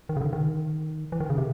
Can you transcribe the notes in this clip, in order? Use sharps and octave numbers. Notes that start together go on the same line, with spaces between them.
D#3
C#3
D3
D#3
E3
D#3
C#3
C3